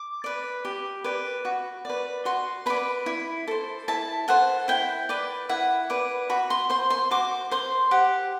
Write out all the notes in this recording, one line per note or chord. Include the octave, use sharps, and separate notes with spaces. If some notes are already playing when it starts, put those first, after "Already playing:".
Already playing: D6
B4 D5
G4
B4 D5
F#4
B4 D5
F#4 C6
B4 D5 B5
E4
A4 C5
E4 A5
A4 C5 F#5
E4 G5
B4 D5
E4 F#5
B4 D5
F#4 B5
C6
C5 C6
C6
F#4 D6
C5 C6
G4 F#5